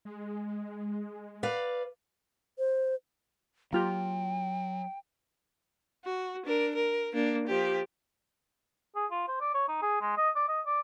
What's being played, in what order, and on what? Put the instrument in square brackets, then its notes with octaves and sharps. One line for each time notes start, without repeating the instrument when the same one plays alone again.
[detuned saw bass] G#3
[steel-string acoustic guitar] B4 D5 F5
[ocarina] C5
[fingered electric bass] F#3 [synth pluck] A#3 F4 G4 [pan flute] G5
[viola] F#4
D4 A#4
A#4
A#3 D4
F3 G4
[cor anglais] G#4
F4
C5
D5
C#5
D#4
G#4
G#3
D#5
D5
D#5
D5